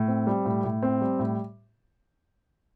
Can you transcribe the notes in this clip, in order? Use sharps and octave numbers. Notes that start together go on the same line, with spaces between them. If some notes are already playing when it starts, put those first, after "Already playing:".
Already playing: A2
C4
G3
A2
A2
C4
G3
A2